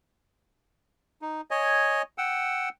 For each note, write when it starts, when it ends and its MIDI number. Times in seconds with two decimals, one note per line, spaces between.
1.22 1.41 63
1.51 2.02 73
1.51 2.02 75
1.51 2.02 80
2.18 2.69 78
2.18 2.69 79
2.18 2.69 88